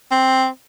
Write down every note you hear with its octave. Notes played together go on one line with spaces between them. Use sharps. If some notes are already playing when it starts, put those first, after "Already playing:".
C4